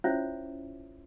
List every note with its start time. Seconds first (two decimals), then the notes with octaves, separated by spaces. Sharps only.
0.04 C#4 E4 F4 C5 C#5 E5